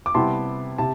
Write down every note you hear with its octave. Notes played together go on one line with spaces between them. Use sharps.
D6
C3 G3 B3 E4 A5 C6
C3 A5